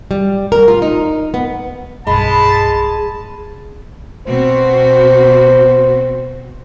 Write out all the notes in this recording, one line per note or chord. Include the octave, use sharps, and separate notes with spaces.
G3
A#4
F4
D#4
B3
B1 G2 G#3 A5 B5
B2 C4 F#4 C5